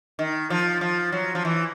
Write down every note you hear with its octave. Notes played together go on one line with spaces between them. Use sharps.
D#3
F3
F3
F#3
F3
E3